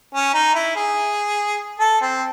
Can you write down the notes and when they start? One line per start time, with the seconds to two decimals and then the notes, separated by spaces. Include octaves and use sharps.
0.14 C#4
0.34 D#4
0.55 E4
0.76 G#4
1.79 A4
2.01 C4